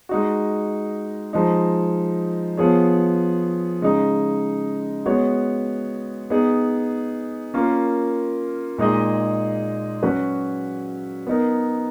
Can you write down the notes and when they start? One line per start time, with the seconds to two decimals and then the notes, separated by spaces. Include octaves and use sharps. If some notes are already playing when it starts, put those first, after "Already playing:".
0.09 G#3 D#4 F#4
1.33 F3 G#3 D#4
2.57 F3 B3 F4 G#4 C#5
3.82 C#3 G#3 D#4
5.06 G#3 B3 F#4 C#5
6.30 B3 D#4 G#4
7.54 A#3 C#4 F4 A#4
8.78 A#2 G#3 D#4 G#4 D#5
10.03 F#3 C#4 F#4 B4
11.27 B3 D#4 A#4